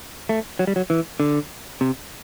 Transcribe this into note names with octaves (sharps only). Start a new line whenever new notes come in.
A3
F#3
G3
F#3
E3
D3
C3